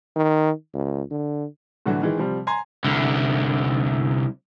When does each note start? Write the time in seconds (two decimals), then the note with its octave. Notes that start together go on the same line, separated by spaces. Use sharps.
0.16 D#3
0.74 C#2
1.11 D3
1.86 A2 D3 E3 F#3 A3 F#4
2.02 D#3 E3 G#3
2.17 C3 F3 G3
2.47 G#5 A#5 C6 G#6
2.84 C2 D3